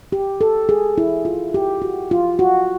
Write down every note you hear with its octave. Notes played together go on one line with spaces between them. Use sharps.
G4
A4
G#4
E4
F4
G4
F#4
F4
F#4